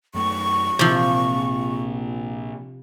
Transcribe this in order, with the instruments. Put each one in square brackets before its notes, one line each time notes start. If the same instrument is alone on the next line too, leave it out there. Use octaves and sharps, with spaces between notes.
[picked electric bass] F#2 A3 [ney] C#6
[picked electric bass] A#1 [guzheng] C3 F3